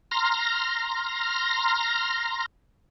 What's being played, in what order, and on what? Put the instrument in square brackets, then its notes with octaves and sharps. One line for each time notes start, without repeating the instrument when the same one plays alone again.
[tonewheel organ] A#5 C6 F6 A#6